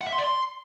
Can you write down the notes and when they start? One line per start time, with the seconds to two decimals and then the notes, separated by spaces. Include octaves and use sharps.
0.01 F#5
0.07 E5
0.13 C6
0.18 D5
0.24 C6